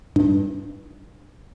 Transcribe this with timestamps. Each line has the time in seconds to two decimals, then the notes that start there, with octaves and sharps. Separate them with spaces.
0.16 G2